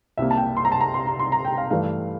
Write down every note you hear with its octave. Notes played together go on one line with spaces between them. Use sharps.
C2 C3 G3 A#3 E5
A5
G5
C6
A#5
A5
A#5
C6
A#5
C6
A#5
G5
F5
G2 E3 A3 F5